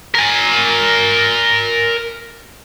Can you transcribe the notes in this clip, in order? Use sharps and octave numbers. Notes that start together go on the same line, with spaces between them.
A#4 G#5